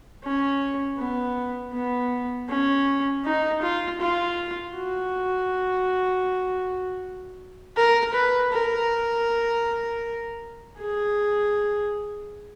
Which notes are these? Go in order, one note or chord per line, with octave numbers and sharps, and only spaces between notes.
C#4
B3
B3
C#4
D#4
F4
F4
F#4
A#4
B4
A#4
G#4